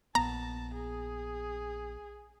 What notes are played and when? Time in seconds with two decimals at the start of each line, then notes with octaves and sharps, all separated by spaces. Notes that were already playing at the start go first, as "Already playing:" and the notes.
0.15 A#1 B3 A5 A#5
0.74 G#4